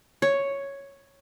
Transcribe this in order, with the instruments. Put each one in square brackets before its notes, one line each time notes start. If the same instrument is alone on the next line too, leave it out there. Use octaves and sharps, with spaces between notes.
[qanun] C#5